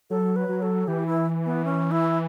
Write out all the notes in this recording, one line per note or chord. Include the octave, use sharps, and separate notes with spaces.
F#3 A4
B4
F#3
A4
E3 G4
E4
B3
C#4
E4